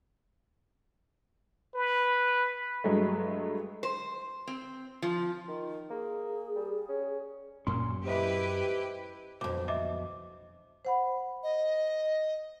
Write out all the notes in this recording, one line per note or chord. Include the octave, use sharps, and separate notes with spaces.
B4
G2 F#3 G#3 A3
C5
C4
F3
D#3
A#3 G#4
G3
C#4
F#2 A#2 C#4 A#4 C6
E4 G4 B4 C5 D#5 E5
B1 F2 D6
D#5 E5 D6
C5 F#5 B5
D#5